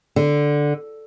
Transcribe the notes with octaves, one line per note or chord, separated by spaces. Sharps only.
D3